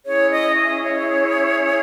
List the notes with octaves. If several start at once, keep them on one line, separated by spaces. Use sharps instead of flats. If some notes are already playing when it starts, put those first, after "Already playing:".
C#4 E4 G#4 C#5
D#5
D#5
C#5